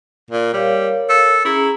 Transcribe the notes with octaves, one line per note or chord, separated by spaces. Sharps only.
A#2
G3 A#4 C#5 F5
A4
C#4 E4 G#4 A#5